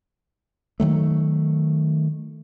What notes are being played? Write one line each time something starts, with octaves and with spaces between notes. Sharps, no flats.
D#3 F#3 A3